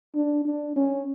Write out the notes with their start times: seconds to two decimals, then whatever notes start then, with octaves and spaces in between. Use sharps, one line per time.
0.15 D4
0.45 D4
0.76 C#4